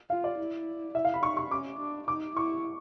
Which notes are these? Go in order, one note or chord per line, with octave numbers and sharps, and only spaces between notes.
F4 F5
D5
E4
E4 E5
F5
B5
D#4 C#6
C#6
C#4 D6
D4
D#4 D6
E4 C#6